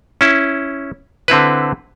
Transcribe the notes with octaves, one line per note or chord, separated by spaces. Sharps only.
C#4 E4
D3 C4 E4 B4